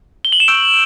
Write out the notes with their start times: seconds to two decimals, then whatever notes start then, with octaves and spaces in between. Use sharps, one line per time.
0.25 G7
0.32 F#7
0.40 E7
0.48 C#6 E6 G6 D7